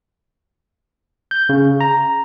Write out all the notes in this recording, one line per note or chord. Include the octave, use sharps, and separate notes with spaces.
G6
C#3
A#5